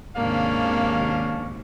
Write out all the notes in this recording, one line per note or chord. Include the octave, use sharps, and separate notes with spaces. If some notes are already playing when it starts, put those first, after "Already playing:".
D#2 G#2 C3 A#3 C#4 D4 F5